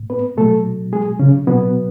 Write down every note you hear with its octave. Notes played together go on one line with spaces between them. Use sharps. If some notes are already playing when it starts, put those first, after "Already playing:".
Already playing: A2
B3 B4
B2 F#3 A3 A4
G#3 G#4
C#3 C#4
B2 F#3 B3